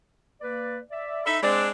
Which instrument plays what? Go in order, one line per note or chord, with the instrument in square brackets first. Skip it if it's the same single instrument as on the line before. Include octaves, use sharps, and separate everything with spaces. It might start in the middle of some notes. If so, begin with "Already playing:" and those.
[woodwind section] A#3 B4 D5
D5 E5
[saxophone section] D#4 A4 E5 [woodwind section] B5
[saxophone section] G#3 C4 D4 [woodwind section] D5